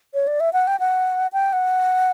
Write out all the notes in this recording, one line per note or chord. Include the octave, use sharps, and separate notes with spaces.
C#5
D5
E5
F#5
G5
F#5
G5
F#5